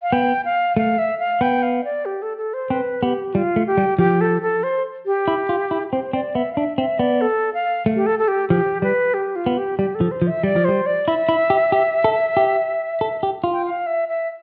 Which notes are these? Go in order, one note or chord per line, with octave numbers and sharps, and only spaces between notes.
F5
B3 G5
F5
A3 F5
E5
F5
B3 G5
F5
D5
G4
A4
A4
C5
C4 B4
B3 G4
G3 F4
A3
G4
G3
F3 G4
A4
A4
C5
G4
E4
F4
E4
C4 C5
C4 D5
B3 E5
F5
D4 E5
C4 E5
B3 D5
A4
F5
A3
G4
A4
A4
G4
F3 G4
G3 B4
G4
F4
B3
G4
G3 G4
A4
F3
C5
F3
E5
G3 D5
F3
G3 C5
D5
E4 E5
E4
G4
G4
A4
G4
A4
G4
F4
G5
F5
E5
E5